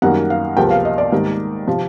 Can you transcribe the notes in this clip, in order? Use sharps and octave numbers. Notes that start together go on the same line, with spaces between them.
F#2 D#3 G3 A#3 F#5
F5
C#2 C3 F3 A#3 G5
F5
D#5
D5
G#2 D#3 G3 A#3
C3 F3